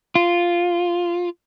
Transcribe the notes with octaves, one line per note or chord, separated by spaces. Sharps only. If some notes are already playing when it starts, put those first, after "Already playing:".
F4